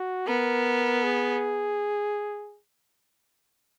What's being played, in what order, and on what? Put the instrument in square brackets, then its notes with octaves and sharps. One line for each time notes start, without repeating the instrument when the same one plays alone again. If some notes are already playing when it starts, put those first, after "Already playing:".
Already playing: [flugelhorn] F#4
[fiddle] B3 [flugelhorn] A#4
[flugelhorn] G#4